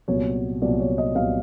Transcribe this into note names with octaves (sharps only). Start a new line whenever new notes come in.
C2 A#2 F#3 B3 C#5
C2 A#2 F#3 B3 D5
C#5
D#5
C2 A#2 F#3 B3 F5